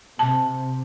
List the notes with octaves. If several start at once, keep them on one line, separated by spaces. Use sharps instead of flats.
C3 A5